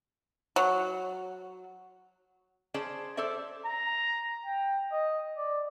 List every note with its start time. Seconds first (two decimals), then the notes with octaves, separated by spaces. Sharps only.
0.56 F#3
2.74 C#4 G#4 C5 D5 A5
3.17 A4 C5 D5 E5
3.66 A#5
4.45 G5
4.92 D#5
5.37 D5